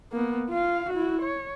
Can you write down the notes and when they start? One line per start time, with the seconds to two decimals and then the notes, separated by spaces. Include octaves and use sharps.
0.12 A#3 B3
0.50 F4 F5
0.90 E4 F#4
1.22 C#5